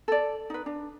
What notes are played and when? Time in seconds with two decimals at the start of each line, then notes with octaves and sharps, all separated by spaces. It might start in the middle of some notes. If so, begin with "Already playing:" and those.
0.08 A4 D5
0.50 D#4 B4
0.66 D4